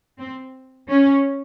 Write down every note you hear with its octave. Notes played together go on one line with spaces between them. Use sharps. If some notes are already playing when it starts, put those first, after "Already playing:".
C4
C#4